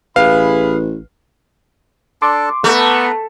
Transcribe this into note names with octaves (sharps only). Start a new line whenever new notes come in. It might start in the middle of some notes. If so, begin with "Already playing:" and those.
A1 E4 G#4 B4 F5 B5
D4 A4 A5 C6 D6
A3 B3 B4 A#5